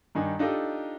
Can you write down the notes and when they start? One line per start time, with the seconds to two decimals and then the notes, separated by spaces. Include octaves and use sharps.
0.15 G2 D#3 D4 D#4 G#5
0.39 D4 D#4 F4 G4 A4 D#5